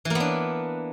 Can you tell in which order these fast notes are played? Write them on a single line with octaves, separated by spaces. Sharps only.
E3 A#3 B3 D4